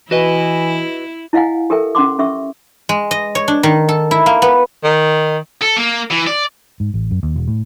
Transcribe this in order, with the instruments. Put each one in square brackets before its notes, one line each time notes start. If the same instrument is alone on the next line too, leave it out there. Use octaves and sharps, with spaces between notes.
[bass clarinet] E3 [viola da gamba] E4 [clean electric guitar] F#4 B4 D#5
[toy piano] E4 D#5 F5 F#5 G#5
G4 A4 A#4 E5 G5
C#4 F#5 C6 D6
C#4 G4 E5 C#6 E6
[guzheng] G#3
D#5
C#5
D4
D#3
A4
E4
A#3
B3
[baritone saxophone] D#3
[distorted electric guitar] A4
A#3
E3
D5
[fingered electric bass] G#2
A1
F#2
D#2
E1
A2